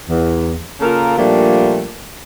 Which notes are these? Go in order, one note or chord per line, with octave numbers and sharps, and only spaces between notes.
E2
C#3 A#3 F4 A4 A#4
A#2 F3 G3 A3 A#3 D4